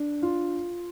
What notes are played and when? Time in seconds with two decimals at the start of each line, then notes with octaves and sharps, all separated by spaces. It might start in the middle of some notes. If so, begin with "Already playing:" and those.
Already playing: D4
0.22 F4